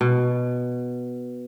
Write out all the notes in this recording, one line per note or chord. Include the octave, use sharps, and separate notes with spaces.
B2